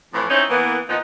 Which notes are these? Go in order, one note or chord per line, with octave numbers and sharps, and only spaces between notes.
F2 A2 E3 F3
C4 C#4 D#4 E4 C5 C#5
E3 A#3 B3
A#2 F3 B3 D#4